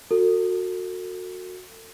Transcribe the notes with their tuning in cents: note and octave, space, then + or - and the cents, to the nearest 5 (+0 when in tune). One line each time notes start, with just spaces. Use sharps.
F#4 -15 A4 +40